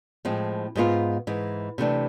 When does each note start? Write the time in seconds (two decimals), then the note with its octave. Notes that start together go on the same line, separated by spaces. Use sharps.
0.25 A2 F3 G#3 C4
0.75 G#2 G#3 B3 F4
1.27 G#2 E3 G#3
1.78 C3 E3 A3 D4